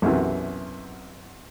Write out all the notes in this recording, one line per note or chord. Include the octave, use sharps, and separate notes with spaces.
B1 F#2 C3 E3